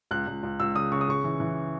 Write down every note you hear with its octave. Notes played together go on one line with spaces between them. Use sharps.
C#2 F#6
C#2
C#2
C#2 E6
C#3 D#6
C#3 C#6
D#6
C#3 C#6
E3
E3